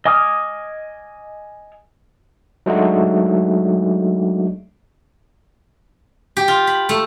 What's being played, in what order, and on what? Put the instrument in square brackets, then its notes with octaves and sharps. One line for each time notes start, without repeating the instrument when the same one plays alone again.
[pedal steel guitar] D#5 G#5 D6 D#6 F6
[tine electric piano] F#3 G#3 A3 D4 D#4 F#4
[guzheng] G4
F4
B5
A3